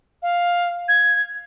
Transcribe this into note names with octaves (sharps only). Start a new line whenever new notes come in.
F5
G#6